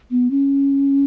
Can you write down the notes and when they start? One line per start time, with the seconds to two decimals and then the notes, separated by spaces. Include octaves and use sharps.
0.11 B3
0.31 C#4